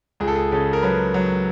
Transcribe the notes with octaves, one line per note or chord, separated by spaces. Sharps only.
C#2 G#4
A4
G#4
C#3 A4
A#4
F#3 B4
F#3